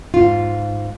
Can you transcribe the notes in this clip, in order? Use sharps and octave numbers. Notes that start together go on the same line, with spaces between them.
G#2 F4